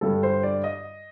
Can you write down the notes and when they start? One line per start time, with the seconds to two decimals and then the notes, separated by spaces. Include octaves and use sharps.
0.01 G2 D3 G3 A4
0.23 C5
0.43 D5
0.64 D#5